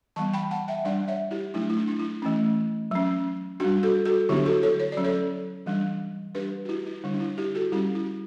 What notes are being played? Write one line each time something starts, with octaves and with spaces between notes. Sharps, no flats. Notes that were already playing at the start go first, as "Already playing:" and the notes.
E3 G3 B3 A5 C#6
G5 B5
F#5 A5
E5 G5
G3 D4 D5 F#5
C#5 E5
E4 G4
F#3 A3 D4 E4
E4
D4
D4
E4
E3 A3 C#4
F#3 C#4
G3 D4 F#4
F#4 A4
F#4 A4
D3 F#3 B3 D4 E4 G4
F#4 A4
A4 C#5
C#5
D5
F#3 C#4
A4 C#5
E3 G3 D4
G3 D4 G4 B4
F#4
E4 G4
E4
D3 G3 D4
D4
E4
E4 G4
F#4 A4
G3 C#4 E4 G4
E4